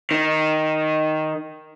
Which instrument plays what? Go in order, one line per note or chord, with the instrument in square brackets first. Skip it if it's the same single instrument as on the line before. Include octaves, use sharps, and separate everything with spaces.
[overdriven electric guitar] D#3